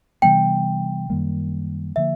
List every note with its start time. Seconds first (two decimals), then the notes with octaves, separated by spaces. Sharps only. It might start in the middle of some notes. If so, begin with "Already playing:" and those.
0.22 C3 E3 G3 B3 G5
1.10 F#2 D#3 G3 A#3
1.96 D3 F3 A#3 E5